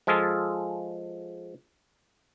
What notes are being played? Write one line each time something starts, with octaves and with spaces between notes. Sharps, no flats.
F3 G#3 F4 G#4 A4